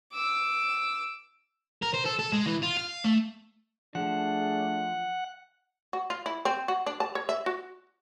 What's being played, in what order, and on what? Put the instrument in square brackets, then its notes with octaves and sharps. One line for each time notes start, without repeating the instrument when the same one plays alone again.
[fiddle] D6 E6
[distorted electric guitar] A#4
C5
A4
A4
G#3
E3
F4
F5
A3
[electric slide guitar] F3 [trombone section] A3 D4 G#4 [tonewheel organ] F#5
[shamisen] F#4
F4
E4
C4
F#4
D4
A5
C#5
E5
F#4